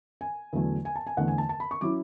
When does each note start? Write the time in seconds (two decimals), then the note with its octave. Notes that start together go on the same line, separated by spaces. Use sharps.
0.21 G#5
0.53 E2 D3 F#3 A3
0.85 G#5
0.96 A5
1.07 G#5
1.17 E2 D3 A3 F#5
1.28 G#5
1.38 A5
1.49 A5
1.60 B5
1.71 C#6
1.81 F#3 C#4 E4 D6